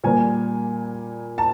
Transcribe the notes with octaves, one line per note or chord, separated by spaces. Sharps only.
A#2 G3 A#3 G#5
A5